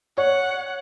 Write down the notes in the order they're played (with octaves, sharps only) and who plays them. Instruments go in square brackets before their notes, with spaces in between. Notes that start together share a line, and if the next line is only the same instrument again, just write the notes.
[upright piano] C#5 [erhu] F#5